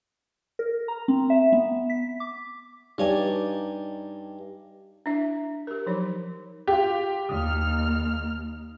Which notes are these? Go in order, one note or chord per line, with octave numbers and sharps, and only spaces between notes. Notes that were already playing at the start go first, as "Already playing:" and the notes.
A#4
A#5
C4
E5
B3
B6
D6
G2 D#4 G4 C#5 D5 G#5
D4 E4 E5
G4 A#4
F3 F#3 D#4 C#5
F4 G4
D#2 D#6 F6